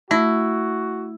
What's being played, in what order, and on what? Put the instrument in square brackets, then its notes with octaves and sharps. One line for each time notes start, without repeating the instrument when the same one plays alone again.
[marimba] A3 A#6 [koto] E4 [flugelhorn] F#4